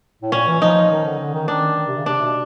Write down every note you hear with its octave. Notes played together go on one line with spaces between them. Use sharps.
A2
A#2 C#4
E3
F3 D#4
D#3
D3
D3
D#3
D#3 D4
D#3
C3
C#3
C3 D4
B2